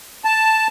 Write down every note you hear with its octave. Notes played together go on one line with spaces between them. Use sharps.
A5